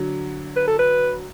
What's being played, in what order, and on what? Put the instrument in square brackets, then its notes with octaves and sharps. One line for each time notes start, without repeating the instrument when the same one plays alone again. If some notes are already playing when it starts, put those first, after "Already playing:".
Already playing: [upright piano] D3 F#3
[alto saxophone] B4
A4
B4